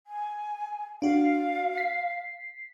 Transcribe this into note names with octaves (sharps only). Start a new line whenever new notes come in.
G#5
D4 F#4 F5
B6 C7